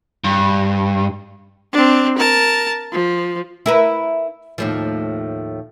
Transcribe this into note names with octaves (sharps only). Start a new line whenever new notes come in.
G2
C4 D4
A#4 A5
F3
E4 A#4 B4
D#2 A2 F3